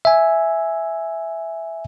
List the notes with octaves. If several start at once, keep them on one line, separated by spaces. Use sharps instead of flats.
E5 G#5